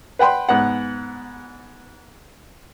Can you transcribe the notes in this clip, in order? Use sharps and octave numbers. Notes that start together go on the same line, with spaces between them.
B4 F#5 G5 B5 C6
G#2 B3 F#5